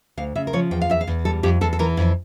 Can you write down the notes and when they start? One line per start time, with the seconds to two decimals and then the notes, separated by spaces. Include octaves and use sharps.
0.17 D2 F5
0.35 C#3 E5
0.47 A#4
0.53 F3 C#5
0.71 E2 G5
0.81 F5
0.90 E2 E5
1.01 F5
1.07 E2
1.25 G3 A4
1.43 F2 G4
1.61 E2 A4
1.73 A4
1.79 E3 A#4
1.97 F2